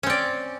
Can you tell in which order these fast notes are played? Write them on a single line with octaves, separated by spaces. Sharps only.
C#4 C4 D5